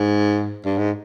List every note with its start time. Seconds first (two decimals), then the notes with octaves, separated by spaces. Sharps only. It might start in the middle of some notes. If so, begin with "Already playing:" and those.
Already playing: G#2
0.65 G2
0.78 G#2